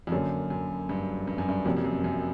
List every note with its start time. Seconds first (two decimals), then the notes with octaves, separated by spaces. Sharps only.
0.07 F2
0.12 F#2 D3 F#3 A#3 C#4
0.50 F#2
0.89 G2
1.27 G2
1.38 F#2
1.49 G2
1.65 F2 C3 F3 A#3 C#4 F#4
1.77 F2
1.85 F#2
2.04 F#2